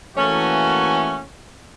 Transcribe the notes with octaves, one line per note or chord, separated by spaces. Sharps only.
E3 A3 A#3 C#4 F#4